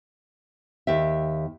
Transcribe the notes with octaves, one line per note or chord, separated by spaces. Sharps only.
D#2 G4 E5